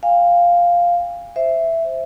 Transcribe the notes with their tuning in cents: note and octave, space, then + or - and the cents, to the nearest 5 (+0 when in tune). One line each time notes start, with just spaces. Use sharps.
F5 +0 G#5 -35
C5 +0 E5 +5